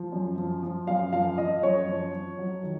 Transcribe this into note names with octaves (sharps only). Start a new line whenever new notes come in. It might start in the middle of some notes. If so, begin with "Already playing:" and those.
Already playing: F3
F#2
F3
F3
F#2 F5
F3 F5
F3 D#5
F#2 C#5
F3
F3
F#3
D#3